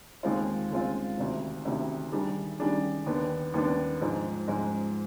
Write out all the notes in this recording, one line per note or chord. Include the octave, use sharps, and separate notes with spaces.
D#2 D#3 G#3 C4 F4
D#2 D#3 G#3 C4 F4
D2 C3 D#3
D2 C3 D#3
D#3 G3 D4 G#4
D#3 G3 D4 G#4
D#2 D#3 B3 D4
D#2 D#3 B3 D4
G#2 F3 G#3
G#2 F3 G#3